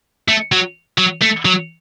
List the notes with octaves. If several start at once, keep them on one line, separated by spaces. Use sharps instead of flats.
A3
F#3
F#3
A3
F#3